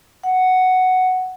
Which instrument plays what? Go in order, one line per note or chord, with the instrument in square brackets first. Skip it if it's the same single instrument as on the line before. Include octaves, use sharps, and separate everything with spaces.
[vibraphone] F#5